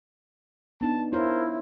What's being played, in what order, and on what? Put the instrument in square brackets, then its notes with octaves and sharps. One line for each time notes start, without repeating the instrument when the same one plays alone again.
[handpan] B3 D4 D#4 [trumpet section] A5
[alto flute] E4 [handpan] F4 C#5 [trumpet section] A#4 C5